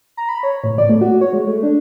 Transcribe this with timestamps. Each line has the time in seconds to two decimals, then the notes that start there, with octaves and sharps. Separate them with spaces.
0.17 A#5
0.29 B5
0.43 C#5
0.64 A2
0.78 D5
0.89 A3
1.01 F#4
1.21 C#5
1.33 G#3
1.47 A3
1.63 D4